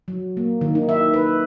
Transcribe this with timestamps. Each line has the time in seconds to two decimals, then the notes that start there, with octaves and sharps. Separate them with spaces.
0.08 F#3
0.37 A#3
0.61 D#3
0.75 D#4
0.89 E5
1.14 B4